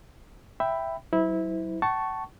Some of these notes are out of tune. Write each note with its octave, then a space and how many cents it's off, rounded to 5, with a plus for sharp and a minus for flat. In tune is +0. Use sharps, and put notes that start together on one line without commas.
E5 +0 G5 +0 B5 +5
F#3 +25 E4 -20 C5 -40
F#5 +45 A5 +0 C#6 +0